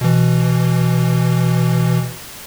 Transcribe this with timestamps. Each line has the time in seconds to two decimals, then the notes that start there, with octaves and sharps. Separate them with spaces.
0.01 B2 E3